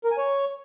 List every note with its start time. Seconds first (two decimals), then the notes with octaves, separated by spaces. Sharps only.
0.05 A#4
0.11 G#5
0.18 C#5